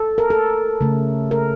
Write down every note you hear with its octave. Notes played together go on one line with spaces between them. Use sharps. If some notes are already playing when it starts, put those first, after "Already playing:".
Already playing: A4
A#4
A4
C#3 A3
A#4